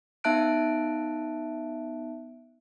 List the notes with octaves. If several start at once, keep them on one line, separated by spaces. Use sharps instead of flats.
B3 D#4 E5 A5 F#6 D7